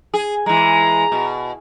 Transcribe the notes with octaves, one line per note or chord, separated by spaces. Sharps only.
G#4
E3 G#3 A#5
B2